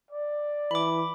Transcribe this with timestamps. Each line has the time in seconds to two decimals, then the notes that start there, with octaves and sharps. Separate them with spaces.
0.11 D5
0.71 E3 B5 D6